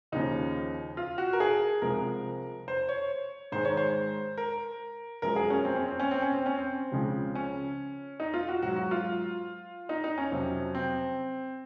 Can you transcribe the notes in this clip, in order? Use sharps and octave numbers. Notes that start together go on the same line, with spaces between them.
D#2 C#3 F3 D#4
F4
F#4
A#4
G#4
C2 C3 F3 G#3 A#4
C5
C#5
G#2 D#3 G#3 C5
C#5
C5
A#4
F#2 F3 G#3 A#4
G#4
C#4
C4
C#4
C4
C#4
C4
C#4
C4
C#4
C4
C#2 C#3 F3 G#3
C#4
D#4
F4
F#4
G#2 F#3 F#4
F#4
F4
D#4
D#4
C#4
F2 C3 F#3
C4